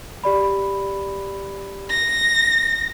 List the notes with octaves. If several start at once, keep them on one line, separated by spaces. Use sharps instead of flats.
G4 D5 B5
A#6